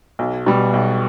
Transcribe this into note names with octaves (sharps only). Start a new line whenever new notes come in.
B1
B2 G3
B1